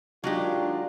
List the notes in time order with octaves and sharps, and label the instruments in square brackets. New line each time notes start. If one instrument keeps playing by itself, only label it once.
[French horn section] D#3 D4 F4 [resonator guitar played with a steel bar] F#3 G#3 G4